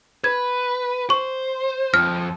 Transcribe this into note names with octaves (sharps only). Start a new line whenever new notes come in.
B4 G#6
C5 C#6
F2 F3 F6